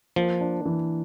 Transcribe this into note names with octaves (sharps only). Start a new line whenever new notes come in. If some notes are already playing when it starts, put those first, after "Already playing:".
F3 A#3
D4
E3